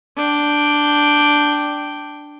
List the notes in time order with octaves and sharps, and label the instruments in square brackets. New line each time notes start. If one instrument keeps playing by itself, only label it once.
[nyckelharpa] D4 G5